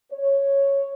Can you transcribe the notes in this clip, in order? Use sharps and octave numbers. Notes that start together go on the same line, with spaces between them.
C#5